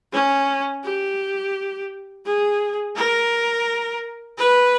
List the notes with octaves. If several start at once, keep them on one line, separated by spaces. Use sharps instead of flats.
C#4
G4
G#4
A#4
B4